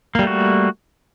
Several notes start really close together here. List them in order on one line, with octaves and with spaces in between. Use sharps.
A#3 G3 A3 F#4